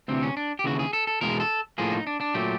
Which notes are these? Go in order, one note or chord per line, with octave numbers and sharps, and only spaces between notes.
D2 C3 E3 C4
C#4
D4
G4
D#2 C#3 E3 F#4
G#4
A4
A4
E2 B2 G#3 A#4
A4
A2 F3 A#3 G#4
D#4
D4
D4
A#2 F#3 A3 G4